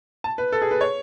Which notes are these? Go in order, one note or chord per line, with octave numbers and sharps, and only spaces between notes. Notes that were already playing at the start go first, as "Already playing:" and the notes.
A5
B4
A4
G#4
B4
C#5